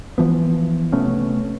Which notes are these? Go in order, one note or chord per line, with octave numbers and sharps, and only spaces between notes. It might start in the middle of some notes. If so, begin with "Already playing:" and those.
E3 F3 B3
C3 A3 B3 C#4